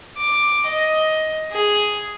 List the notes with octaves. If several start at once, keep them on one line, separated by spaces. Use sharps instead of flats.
D6
D#5
G#4